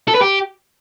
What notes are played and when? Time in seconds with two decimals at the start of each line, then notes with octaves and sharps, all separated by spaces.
0.08 A4
0.15 B4
0.22 G4